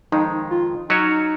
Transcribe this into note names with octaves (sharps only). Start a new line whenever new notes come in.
F2 D#3 G#3 D#4
F4
F#3 C#4 D#4 F#4 C#5